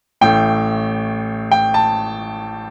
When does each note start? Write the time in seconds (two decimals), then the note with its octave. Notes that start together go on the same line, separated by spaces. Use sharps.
0.21 A1 A2 A3 G5
1.51 G5
1.74 A5